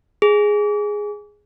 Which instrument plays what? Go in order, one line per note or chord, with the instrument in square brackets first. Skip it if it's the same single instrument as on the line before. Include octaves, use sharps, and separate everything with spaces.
[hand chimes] G#4